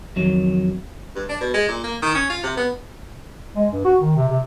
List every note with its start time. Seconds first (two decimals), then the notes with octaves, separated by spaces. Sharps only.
0.16 F2 D#3 F#3
1.15 G2
1.29 D4
1.41 B2
1.54 G#3
1.68 A#2
1.84 A#3
2.02 D#3
2.15 C#4
2.30 F4
2.43 C3
2.57 B3
3.56 G#3
3.72 G2
3.85 F#4
4.00 D#3
4.16 C3
4.29 C3